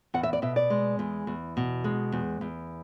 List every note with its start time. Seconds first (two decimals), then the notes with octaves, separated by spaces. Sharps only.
0.14 E2 F#5
0.23 E5
0.33 D5
0.42 B2 E5
0.56 D5
0.70 G#3
0.99 E2
1.27 E2
1.57 B2
1.84 G#3
2.12 E2
2.41 E2